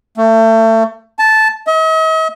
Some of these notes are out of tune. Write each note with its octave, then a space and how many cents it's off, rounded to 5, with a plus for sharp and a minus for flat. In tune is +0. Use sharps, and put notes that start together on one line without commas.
A3 +30
A5 -10
D#5 +45